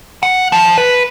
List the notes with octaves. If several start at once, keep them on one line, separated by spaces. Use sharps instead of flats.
F#5
F3
B4